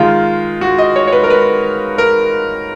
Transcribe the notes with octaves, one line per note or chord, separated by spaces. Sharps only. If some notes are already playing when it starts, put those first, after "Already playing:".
Already playing: D#3 G#3 F4
F#4
D#5
C#5
C#5
B4
A#4
B4
A#4